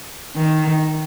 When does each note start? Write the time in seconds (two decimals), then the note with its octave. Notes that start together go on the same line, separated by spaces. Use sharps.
0.36 D#3